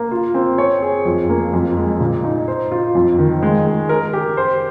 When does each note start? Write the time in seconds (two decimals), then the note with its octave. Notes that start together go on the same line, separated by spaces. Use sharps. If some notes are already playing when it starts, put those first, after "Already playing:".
Already playing: A#3
0.11 F4
0.34 C4
0.58 C#5
0.82 G#4
1.06 F2
1.29 A#3
1.53 F2
1.77 G#3
2.00 A#2
2.24 D#4
2.48 C5
2.72 F4
2.95 F2
3.18 D#3
3.42 G#3
3.66 G#4
3.89 A#4
4.13 G4
4.37 C5